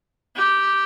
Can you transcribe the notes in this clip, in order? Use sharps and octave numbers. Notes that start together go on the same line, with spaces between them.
G4